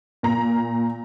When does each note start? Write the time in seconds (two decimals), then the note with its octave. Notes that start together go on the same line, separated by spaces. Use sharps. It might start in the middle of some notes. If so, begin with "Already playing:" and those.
0.23 A#2 A#5